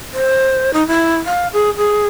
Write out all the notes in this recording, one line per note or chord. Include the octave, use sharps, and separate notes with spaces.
C5
D#4
E4
F5
G#4
G#4